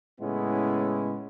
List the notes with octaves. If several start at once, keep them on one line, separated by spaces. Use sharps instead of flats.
A2 C#3 G#3 B3 C#4 E4